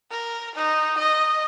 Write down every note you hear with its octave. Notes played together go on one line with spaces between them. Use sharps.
A#4
D#4
D#5